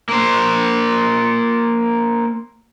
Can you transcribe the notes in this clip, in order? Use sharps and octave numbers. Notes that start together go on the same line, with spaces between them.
A#3 C5